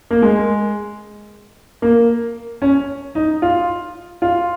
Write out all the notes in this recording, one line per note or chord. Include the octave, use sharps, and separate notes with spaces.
A#3
G#3
A#3
C#4
D#4
F4
F4